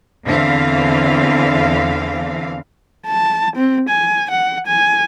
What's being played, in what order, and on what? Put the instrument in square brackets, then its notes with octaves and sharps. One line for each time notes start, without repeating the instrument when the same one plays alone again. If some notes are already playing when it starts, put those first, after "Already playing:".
[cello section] E2 D3 E3 C4 F5
[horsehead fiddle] A5
C4
G#5
F#5
G#5